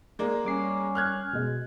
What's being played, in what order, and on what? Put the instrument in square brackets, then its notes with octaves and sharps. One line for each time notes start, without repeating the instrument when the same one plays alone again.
[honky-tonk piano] G#3 A#3 D5
[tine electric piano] G3 D6 C7 [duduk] C#4
[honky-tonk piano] F6 F#6 G#6
[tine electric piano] B2 G#3